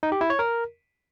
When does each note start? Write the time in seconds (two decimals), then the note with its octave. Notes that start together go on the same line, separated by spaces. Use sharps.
0.03 D#4
0.12 G4
0.21 E4
0.30 C#5
0.39 A#4